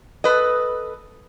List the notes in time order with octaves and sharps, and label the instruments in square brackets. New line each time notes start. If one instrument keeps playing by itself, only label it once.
[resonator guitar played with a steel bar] A4 B4 D#5